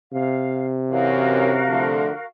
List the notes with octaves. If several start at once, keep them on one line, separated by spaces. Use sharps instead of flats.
C3 F5
F#2 E3 F#4 A#4 C#5 F5
D3 F3 A3